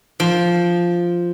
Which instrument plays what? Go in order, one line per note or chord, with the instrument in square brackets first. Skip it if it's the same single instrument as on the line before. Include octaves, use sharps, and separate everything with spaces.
[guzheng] F3